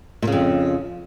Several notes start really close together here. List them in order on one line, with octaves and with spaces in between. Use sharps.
A#2 C#3 F2